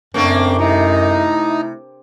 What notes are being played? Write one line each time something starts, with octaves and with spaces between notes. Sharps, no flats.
F#2 C#3 A3 A#3 C4 D4
C3 A3 D#4 E4